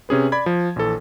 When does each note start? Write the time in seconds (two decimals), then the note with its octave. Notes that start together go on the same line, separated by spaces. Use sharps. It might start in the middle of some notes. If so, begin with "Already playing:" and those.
0.09 C3 C#4 G#4 B4
0.32 D5 B5 G#6
0.46 F3
0.76 A#1 E3 A4